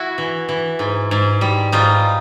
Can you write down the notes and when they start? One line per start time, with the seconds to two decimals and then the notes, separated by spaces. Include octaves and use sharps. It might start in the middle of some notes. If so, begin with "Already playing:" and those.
Already playing: E4 F#4
0.18 E3
0.49 E3
0.79 G#2
1.11 G#2
1.41 G3
1.72 G#2 D#4 F4